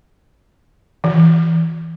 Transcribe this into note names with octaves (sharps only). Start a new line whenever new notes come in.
E3